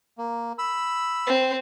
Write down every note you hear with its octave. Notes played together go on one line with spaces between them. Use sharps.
A#3
B5 E6
C4